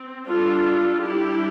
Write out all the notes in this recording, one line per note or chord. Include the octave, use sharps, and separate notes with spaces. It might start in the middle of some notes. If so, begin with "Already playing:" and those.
Already playing: C4
G3 D4 F4 A4
G3 D4 E4 G4